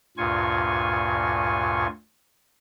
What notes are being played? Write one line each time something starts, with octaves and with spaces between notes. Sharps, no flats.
D2 G2 A#2 F4 G#5 C#6